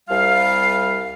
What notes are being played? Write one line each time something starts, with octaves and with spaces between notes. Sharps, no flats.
C2 G3 F5